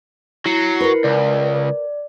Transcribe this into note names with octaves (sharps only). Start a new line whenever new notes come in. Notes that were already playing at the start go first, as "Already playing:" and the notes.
F#3 E4 C7 C#7
A#4 B4
C#2 D5